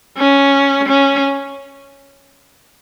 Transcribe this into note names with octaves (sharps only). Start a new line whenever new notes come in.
C#4
C#4